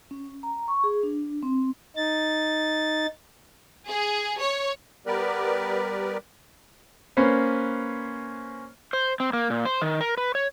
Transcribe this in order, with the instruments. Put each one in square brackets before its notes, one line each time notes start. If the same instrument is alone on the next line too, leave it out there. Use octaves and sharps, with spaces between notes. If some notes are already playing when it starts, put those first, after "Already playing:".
[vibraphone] C#4
A#5
C#6
G#4
D4
C4
[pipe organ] D#4 A6
[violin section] G#4
C#5
[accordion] G3 B3 G4 A#4 B4 D5
[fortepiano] A#3 C#4 B4 C5
[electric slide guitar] C5
C4
A#3
A#2
C5
D#3
A#4
B4
C#5